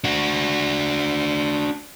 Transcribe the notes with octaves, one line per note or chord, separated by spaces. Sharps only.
D4 F#4